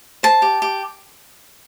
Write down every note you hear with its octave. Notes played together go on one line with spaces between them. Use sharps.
C5 A5
G4
G4